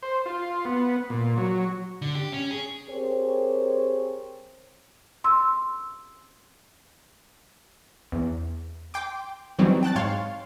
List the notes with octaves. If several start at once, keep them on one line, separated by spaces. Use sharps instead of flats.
C5
F4
B3
A#2
F#3
D3
G4
C#4
G#4
C4 G4 G#4 A#4 C5 C#5
C6 E6
E2
G5 C6 D6
E3 F#3 G3 C4 D#4
G5 A5 F#6 A6
G#2 C#5 F5 C6